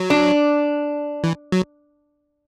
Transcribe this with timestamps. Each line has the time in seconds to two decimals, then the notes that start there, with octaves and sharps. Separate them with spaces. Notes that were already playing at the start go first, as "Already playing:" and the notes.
Already playing: F#3
0.10 D4
1.24 E3
1.52 F#3